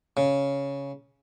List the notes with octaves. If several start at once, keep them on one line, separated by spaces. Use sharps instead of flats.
C#3